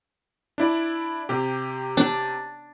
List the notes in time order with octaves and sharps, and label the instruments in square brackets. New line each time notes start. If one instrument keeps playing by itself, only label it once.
[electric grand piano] D4 E4 D5
C3 G4
[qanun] D4